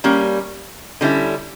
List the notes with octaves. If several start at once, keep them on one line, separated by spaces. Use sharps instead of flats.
G3 A#3 C#4
D3 G3 C#4 E4